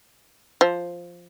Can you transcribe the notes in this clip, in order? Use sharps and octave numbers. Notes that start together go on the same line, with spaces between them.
F3